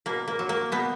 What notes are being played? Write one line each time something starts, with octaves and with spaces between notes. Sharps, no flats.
B2 A#3
A#3
F#3
A#3
B2 B3